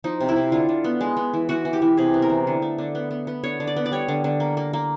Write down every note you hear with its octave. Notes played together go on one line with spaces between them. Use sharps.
F3 D#4
C3
E4
C3
D3 F4
D3
B3
G#3
B3
E3
E3 F#4
E3
G4
E3
C3 G#4
B3
A#4
E3
D3
A3
D3
B3
B3
B3
D3 C#5
D3
D5
B3
D5
G3 C#5
D3
D3
A#3
A#3
A#3